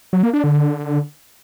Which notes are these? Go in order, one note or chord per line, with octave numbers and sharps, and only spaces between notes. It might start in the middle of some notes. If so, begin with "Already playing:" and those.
F#3
A#3
D4
D3